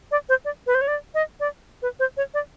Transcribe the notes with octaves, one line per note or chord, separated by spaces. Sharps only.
D5
C5
D5
B4
C5
C#5
D5
D#5
D5
B4
C5
C#5
D5